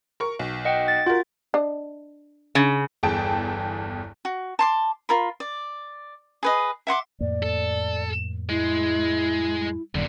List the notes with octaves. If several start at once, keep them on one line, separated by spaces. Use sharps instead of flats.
A#4 C#6
B1
D#5 F#5 G5
A6
F4 F#4 A#4
D4 D#5
C#3
G1 E2 G#4 G5 A5 D7
F#4
A5 C6 D6
F4 A#4 B5
D5
G#4 B4 D#5
E5 F#5 C6 D6
F2 A2 A#3 D5
A4
G#3 E4
G1 F#2 A#2 D3 D5